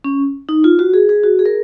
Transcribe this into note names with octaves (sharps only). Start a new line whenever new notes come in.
C#4
D#4
F4
F#4
G#4
G#4
F#4
G#4
A#4